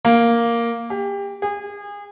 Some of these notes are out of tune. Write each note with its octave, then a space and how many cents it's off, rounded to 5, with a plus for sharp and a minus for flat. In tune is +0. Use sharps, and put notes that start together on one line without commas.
A#3 +0
G4 +30
G#4 -30